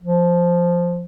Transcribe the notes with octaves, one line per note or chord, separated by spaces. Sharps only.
F3